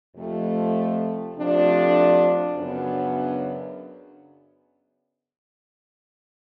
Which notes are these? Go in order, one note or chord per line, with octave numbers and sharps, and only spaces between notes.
F2 C3 F3 A3
C3 F3 A3 D4
F#2 C#3 F#3 B3 D4